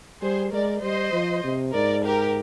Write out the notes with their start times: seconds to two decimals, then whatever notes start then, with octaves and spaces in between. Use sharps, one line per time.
0.22 G3 G#4 C5
0.52 G#3 A#4 D5
0.82 G3 C5 D#5
1.12 F3
1.44 C3
1.73 G#2 A#4 D5
2.04 G4 A#4